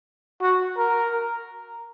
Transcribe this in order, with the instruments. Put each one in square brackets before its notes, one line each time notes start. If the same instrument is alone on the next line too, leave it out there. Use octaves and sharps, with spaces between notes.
[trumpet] F#4
A#4